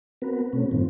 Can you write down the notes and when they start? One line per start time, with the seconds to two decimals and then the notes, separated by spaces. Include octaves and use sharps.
0.22 B3 C4 F#4 A#4 B4
0.53 B2 A3 C4 C#4
0.71 G2 A#2 D#3 F3 C4